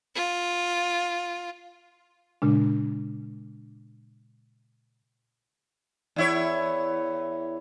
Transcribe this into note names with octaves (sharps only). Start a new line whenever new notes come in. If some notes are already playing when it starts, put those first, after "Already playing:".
F4
A#2 C#3 G#3 D4
E2 E4 C#5